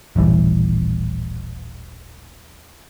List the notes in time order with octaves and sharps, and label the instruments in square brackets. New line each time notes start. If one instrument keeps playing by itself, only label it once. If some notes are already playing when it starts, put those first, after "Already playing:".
[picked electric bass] D#1 A1 E3 G3